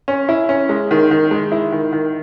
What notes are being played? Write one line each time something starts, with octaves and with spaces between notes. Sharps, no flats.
C#4
E4
C#4
G#3
D#3
D#3
G#3
E4
D#3
D#3